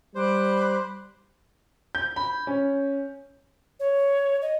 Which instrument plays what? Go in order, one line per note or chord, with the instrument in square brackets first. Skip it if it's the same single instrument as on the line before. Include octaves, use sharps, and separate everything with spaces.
[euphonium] G3 [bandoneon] C5 [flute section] B5 D6 F#6
[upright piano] G6
B5
C#4
[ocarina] C#5
D#5